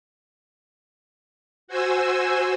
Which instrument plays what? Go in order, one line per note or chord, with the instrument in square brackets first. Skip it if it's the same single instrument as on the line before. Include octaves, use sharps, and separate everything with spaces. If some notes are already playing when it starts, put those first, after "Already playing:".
[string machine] F#4 C5 G#5 E6